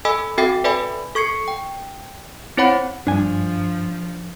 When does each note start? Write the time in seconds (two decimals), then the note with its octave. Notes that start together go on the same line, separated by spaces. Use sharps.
0.05 A4 D#5 G#5 B5 E6
0.38 C4 F#4 A4 E5 G5 C7
0.64 A4 B4 D5 E5 G#5 B5
1.15 A4 C#6 G#6 C7 C#7
1.48 G5
2.57 C4 E4 C5 C#5 F#5 B5
3.07 G2 F3 D4 G#5